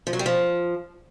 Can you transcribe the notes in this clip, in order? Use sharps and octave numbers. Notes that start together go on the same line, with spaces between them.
F3
F#3
G3
F3